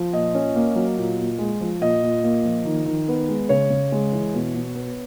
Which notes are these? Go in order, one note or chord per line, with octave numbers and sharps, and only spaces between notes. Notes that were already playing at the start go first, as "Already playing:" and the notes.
Already playing: F3
A#2 D#5
C#4
A#3
F#3
A#2
A#2
G#3
F3
A#2 D#5
A#2
A#3
F3
D#3
D#3
B3
G#3
C#3 C#5
C#3
G#3
E3
B2
B2
B3